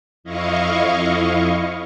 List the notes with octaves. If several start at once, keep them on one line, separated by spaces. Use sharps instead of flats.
F2 E4 D#5 F5 C#6